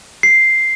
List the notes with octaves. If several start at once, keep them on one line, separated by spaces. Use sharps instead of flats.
C7